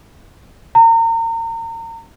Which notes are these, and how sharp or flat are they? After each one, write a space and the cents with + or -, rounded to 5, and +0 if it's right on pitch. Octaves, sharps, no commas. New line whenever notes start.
A#5 -35